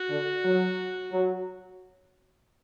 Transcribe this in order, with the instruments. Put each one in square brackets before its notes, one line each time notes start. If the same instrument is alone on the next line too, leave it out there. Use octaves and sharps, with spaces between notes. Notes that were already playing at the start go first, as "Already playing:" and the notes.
Already playing: [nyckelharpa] F#4
[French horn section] D3
F#3
F#3